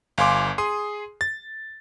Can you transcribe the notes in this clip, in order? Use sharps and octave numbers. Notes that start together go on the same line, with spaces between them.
G1 F5 G#5 C6 D6
G#4 C6 D#6
A6